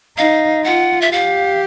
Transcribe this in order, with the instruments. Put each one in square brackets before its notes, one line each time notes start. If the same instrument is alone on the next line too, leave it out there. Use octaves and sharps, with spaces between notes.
[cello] D#4 [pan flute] F5
[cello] F4 [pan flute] F#5
[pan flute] E5
[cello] G4 [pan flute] F5